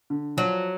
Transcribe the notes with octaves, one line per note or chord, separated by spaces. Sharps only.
D3
F3 F#3